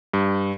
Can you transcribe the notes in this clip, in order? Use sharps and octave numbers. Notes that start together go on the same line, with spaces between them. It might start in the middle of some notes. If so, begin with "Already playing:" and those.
G2